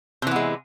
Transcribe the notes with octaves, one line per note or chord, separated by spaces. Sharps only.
C3 E3 G#3 B3